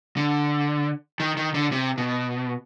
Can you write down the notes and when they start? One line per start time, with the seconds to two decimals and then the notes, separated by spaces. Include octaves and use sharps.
0.17 D3
1.20 D#3
1.37 D#3
1.54 D3
1.72 C3
1.98 B2